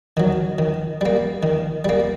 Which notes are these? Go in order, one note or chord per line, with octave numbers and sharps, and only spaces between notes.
D#3 F#3
D#3
G3 A#3
D#3
G3 A#3